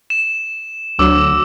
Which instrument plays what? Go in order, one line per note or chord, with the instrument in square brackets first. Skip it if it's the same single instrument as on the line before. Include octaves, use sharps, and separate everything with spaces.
[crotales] E7
[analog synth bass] D2 [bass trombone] F#3 [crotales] D6 E6